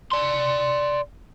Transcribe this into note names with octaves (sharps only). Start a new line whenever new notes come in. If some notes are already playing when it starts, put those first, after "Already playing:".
D5 C6